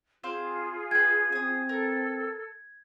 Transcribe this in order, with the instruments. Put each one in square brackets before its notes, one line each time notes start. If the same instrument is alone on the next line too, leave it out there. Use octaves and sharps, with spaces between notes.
[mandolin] C4 C5 F5 [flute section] F4 G#4
[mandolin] B4 G5 [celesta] G#6
[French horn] C4 [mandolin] G#5 D#6
[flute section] A4 [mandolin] A#4